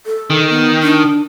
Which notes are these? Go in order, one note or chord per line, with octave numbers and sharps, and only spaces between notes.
A4
D#3
B3
D4